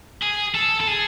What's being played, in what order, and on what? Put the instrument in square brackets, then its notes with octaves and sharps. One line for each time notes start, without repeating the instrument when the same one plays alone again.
[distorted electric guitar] G#4
A4
A4
G#4